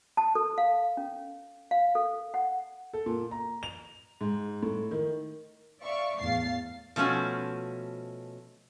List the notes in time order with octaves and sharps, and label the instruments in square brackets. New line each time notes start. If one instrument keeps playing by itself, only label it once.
[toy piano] A5
A4
F5
C#4
F5
A4
F#5
[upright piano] A4
A#2
A#5
F7
G#2
A2
D#3
[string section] D5 E5 F5 C#6
E2 A2 F5 A6 C7
[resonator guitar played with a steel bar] B2 F3 A3 C#4 F#4